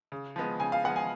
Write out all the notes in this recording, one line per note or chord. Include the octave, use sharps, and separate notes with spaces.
C#3
F3 G#3 B3
C#3 G#5
F5
F3 G#3 B3 F#5
G#5